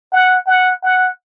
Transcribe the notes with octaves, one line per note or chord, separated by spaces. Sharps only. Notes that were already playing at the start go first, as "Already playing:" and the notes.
F#5
F#5
F#5